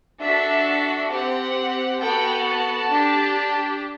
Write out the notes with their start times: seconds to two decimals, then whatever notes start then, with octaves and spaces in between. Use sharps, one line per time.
0.20 D4 F#4 A4 E5
1.11 C4 G4 F#5
2.00 B3 F#4 A4 G5
2.45 A5
2.91 D4 G4